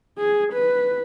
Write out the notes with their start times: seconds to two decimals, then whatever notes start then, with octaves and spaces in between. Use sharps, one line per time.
0.18 G#4
0.53 B4